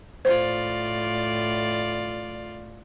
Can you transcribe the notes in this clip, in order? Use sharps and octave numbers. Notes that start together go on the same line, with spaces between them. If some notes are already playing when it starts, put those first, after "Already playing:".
A2 F4 C5 D5